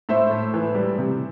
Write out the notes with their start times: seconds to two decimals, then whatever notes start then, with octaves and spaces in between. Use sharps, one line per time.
0.09 A2 C5 E5
0.31 A2
0.54 E3
0.75 G3
0.98 C3